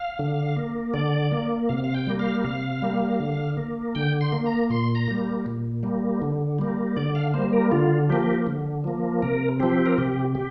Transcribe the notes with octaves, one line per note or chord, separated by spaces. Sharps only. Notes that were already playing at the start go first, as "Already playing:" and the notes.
Already playing: F5
D3
A#3
D3 D5
A#3
C3 F5
F5
G5
G3 A#3
F5
C3 F5
G3 A#3
D3
A#3
D3 G5
C6
A#3
A#5
A#2 C6
A#5
G3 A#3
A#2
G3 A#3
D3
G3 A#3
D3 D5
F5
G3 A#3 C5
A#4
D3 F4
F3 A#3 G4
D3
F3 A#3
C3 A#4
F3 C4 G4
A#4
C3 G4
G4